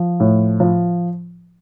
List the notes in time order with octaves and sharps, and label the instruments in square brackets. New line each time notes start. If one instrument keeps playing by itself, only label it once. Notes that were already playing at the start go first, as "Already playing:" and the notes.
Already playing: [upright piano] F3
A2
F3